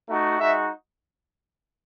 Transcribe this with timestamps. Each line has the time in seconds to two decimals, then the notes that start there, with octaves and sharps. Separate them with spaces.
0.09 A3 D#4 F#4
0.40 G#3 D#4 F#4 E5